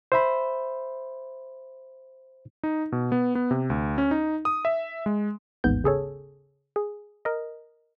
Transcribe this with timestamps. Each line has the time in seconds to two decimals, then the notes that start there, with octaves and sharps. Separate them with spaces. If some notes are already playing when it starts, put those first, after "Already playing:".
0.12 C5 E5 B5
2.63 D#4
2.92 B2
3.12 B3
3.35 B3
3.51 C3
3.70 D2
3.98 C#4
4.11 D#4
4.45 D#6
4.65 E5
5.06 G#3
5.64 A1 D#2 G#2 B3 G6
5.84 C#3 G#4 A4 C#5
6.76 G#4
7.25 A#4 D#5